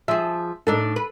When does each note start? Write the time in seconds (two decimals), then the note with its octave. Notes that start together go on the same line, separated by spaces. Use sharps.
0.08 F3 G#4 E5
0.67 A2 D4 D#4 A4
0.96 B4